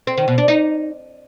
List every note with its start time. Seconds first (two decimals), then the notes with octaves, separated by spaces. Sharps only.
0.07 C4
0.17 D#3
0.28 B2
0.38 D4
0.48 D#4